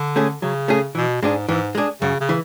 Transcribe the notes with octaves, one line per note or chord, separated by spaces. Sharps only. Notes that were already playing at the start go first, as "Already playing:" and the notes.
Already playing: D3
A3 C#4 G#4
C#3 F#3
A3 C#4 G#4
B2 E3
G#2 G#3 D4 G#4
G#2 E3
G#3 D4 G#4
F#2 C#3
C#3
E3